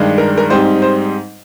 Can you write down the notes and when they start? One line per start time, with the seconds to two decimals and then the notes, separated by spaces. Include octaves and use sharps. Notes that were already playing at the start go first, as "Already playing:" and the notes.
Already playing: G2 D#3 G#3 D4
0.18 A#4
0.38 A#4
0.50 G#2 G3 C4 D#4 C5
0.82 C5